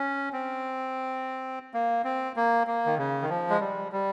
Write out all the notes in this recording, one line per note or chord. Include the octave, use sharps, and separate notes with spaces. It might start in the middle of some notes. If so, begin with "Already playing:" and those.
Already playing: C#4
C4
A#3
C4
A#3
A#3
D#3
C#3
D#3
F3
G#3
G3
G3